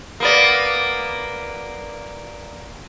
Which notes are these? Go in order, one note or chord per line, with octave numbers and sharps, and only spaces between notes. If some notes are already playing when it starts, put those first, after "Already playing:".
A#3 B3 D5